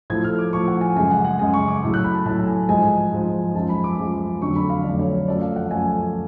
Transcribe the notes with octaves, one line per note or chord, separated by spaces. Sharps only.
A2 F3 A3 G#6
F6
D6
A2 F3 A3 C#6
F#5
G#5
F#2 C#3 G#3 G#5
F#5
F#5
F#2 C#3 G#3 G#5
C#6
D6
A2 F#3 A3
F#6
B5
A5
A2 F#3 A3 A5
G#5
G#2 F3 G#3 G#5
G#2 F3 G#3
F#2 F3 G#3 A5
B5
D6
F#2 F3 G#3
F2 D3 F#3 A3 C#6
B5
F5
F2 D3 F#3 A3 D5
C#5
C#5
F#2 F3 A3 D5
F5
F#5
F#2 F3 A3 G#5